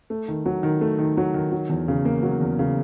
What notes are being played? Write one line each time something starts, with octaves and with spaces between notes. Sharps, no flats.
A3
D#3
F#3
D#3
A3
D#3
F#3
D#3
F#3
E2
C#3
A#3
F#3
E2
C#3